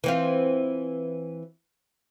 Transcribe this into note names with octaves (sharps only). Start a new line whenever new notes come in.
E3 C4 F4